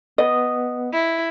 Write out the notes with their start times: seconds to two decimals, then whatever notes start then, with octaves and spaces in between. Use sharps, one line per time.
0.18 B3 D#5
0.92 E4